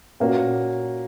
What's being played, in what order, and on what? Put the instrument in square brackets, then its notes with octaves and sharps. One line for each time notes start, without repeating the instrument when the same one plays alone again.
[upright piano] A#2 A#3 C#4 F#4